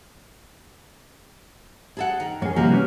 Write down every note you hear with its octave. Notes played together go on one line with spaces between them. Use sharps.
G#4 A4 F#5
D#3
F#2 C#4 G#4
D#2 C3 F3 G3 A#3 F#4
B3 C#4